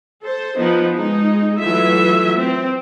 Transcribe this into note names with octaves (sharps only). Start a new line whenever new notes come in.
A4 C5
F3 B3 D#4
G#3 D#4
E3 F#3 A3 F4 E5
C4